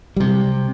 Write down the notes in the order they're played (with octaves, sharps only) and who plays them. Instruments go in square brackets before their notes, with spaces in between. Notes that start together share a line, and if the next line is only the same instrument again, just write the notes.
[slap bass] C3 G3